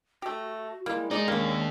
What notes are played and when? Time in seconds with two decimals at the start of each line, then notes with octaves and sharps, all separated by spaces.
0.22 A3 F#4 G4
0.86 G3 G#3 A#3 E4
1.11 G#3 D#4 G#4 A#4 D5 C6
1.28 D#2 A#3 C#4 D4 G4